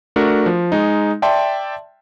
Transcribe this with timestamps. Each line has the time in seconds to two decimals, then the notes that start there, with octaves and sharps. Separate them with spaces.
0.16 A3 D4 F#4 A#4
0.46 F3
0.72 G#3 D#4
1.22 D5 E5 G5 A5 C6